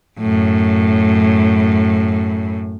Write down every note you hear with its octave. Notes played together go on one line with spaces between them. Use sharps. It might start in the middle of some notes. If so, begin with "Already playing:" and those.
F#2 A2